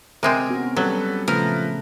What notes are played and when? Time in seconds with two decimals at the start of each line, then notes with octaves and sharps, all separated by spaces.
0.23 C3 G#3 C4 A#4 C5
0.49 B3 C#4 F#4
0.76 F#3 G3 C#4 A4 B4
1.28 A#2 C#3 F3 A3 A#4 B4